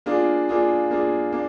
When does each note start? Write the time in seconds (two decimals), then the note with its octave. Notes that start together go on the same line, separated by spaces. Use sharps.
0.06 A#3 D4 F4 G#4
0.49 A#3 D4 F4 G#4
0.91 A#3 D4 F4 G#4
1.32 A#3 D4